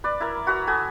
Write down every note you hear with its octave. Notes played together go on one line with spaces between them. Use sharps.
B4 D5
E4 A#4
F#4 B4 A#5 E6
F#4 A4 G#5 D#6